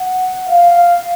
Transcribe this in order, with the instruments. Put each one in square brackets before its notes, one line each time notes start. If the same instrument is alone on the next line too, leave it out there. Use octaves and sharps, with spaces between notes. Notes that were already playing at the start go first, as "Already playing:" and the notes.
Already playing: [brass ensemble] F#5
F5